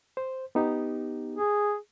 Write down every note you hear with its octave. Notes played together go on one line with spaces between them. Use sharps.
C5
B3 D#4 G4
G#4